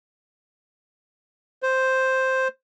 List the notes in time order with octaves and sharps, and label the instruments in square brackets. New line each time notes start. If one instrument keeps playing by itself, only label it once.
[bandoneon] C5